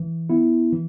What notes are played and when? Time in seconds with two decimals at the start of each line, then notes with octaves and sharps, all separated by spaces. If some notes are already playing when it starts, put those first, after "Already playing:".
Already playing: E3
0.30 B3 E4
0.73 E3